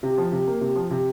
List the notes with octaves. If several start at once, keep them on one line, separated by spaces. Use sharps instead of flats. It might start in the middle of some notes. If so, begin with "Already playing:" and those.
C3
F3
C3
A#3
C3
F3
C3